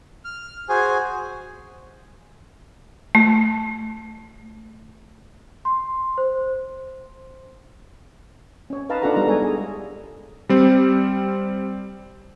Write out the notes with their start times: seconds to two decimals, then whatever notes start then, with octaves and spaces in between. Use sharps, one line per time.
0.25 F6
0.69 F#4 G#4 C5 G#5
3.15 A3
5.65 C6
6.18 C5
8.70 C#4 C#5
8.89 D#4 B4 D#5 F5 A5 A#5
9.02 D4 D#4 F4 A4 F#5 A#5
9.14 G3 B3 D#4 A#4 A#5
9.27 G#3 A4 C#5 D#5 G#5
9.42 D4 G#4
10.49 G3 C4